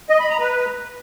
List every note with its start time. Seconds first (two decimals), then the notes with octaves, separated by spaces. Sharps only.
0.10 D#5
0.20 B5
0.30 A#5
0.40 B4